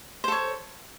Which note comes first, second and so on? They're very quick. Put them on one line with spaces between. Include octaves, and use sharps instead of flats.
C5 A4 C#5